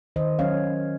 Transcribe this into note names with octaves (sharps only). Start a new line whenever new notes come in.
D#3 C5 D#5
F#3 C#4 C#5 F5